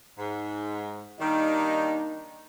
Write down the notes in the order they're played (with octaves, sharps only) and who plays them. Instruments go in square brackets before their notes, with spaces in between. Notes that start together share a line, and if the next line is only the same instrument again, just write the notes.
[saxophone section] G#2
[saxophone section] D#3 G3 [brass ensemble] A#3 D4 D#4